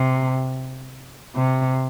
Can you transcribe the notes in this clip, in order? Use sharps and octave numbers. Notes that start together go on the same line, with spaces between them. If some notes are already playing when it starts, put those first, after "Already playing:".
Already playing: C3
C3